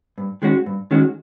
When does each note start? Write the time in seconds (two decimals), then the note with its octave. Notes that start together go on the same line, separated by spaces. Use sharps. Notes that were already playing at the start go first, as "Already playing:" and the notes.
0.18 G2
0.42 D#3 G#3 C#4 F#4
0.66 G2
0.91 D#3 G#3 C#4 F#4